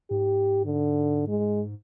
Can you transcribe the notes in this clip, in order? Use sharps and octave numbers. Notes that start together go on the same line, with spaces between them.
G#2 G4
D3
G#3